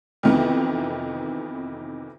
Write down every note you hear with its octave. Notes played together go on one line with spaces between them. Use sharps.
F2 C3 D#3 E3 B3